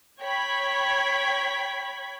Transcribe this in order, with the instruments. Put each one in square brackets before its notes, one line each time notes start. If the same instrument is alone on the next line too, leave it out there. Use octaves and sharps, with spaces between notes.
[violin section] C#5 G5 B5 G#6 B6